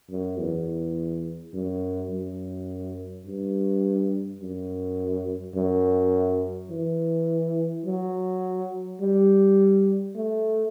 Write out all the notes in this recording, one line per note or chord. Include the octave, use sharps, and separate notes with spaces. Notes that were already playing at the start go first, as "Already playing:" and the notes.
F#2
E2
F#2
F#2
G2
F#2
F#2
E3
F#3
G3
A3